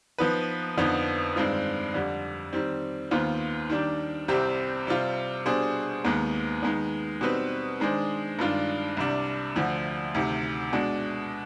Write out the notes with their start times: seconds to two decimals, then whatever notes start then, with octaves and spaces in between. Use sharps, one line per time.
0.18 F3 B3 D#4 B4
0.77 F2 D3 F3 B3 D#4
1.36 G2 D#3 G#3 C4 F4
1.94 F2 D3 G3
2.53 D#3 G3 C4
3.11 D#2 D#3 B3 F4 C5
3.70 D#3 G3 D4 G4
4.28 C2 C3 G3 C4 G4
4.87 C3 G3 C4 F4
5.45 B2 G3 D4 G#4 C5
6.04 D#2 D#3 G#3 B3
6.63 D#3 G#3 B3
7.21 B2 G3 C4 D#4 B4
7.80 D#3 G#3 D4 G#4 C5
8.39 G2 D#3 G#3 D4 F4
8.97 C2 C3 G3 D4
9.56 D2 D3 F3
10.15 D2 C3 D#3
10.73 B2 G#3 D4